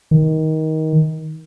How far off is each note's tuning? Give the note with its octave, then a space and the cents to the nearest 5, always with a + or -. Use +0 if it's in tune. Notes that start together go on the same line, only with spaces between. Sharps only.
D#3 +20